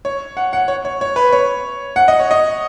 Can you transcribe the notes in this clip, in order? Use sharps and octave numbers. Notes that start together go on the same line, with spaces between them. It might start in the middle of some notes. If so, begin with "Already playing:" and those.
C#5
F#5
F#5
C#5
C#5
C#5
B4
C#5
F#5
D#5
C#5
D#5